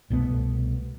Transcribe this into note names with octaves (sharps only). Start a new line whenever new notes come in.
C2 B2 A3 B3